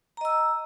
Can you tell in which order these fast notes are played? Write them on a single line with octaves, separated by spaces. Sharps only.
A#5 D#5 E6